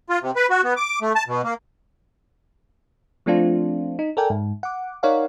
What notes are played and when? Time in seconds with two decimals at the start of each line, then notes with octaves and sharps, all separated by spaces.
0.10 F4
0.22 C3
0.36 B4
0.50 F#4
0.64 B3
0.77 D6
1.02 A3
1.15 A5
1.28 B2
1.44 A#3
3.26 F3 A3 C4 D4 F4
3.99 D#4
4.17 A4 A#4 D5 G5 G#5
4.30 G#2
4.63 F#5 D6
5.03 D#4 A#4 C#5 D5 F5 F#5